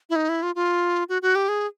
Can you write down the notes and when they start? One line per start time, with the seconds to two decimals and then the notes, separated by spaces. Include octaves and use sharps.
0.10 E4
0.16 D#4
0.29 E4
0.43 F4
0.55 F4
1.09 F#4
1.22 F#4
1.35 G4
1.49 G#4